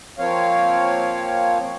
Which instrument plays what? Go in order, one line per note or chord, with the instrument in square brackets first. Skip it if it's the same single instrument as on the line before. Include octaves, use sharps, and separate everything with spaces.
[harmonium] F3 A#3 C4 C#5 F5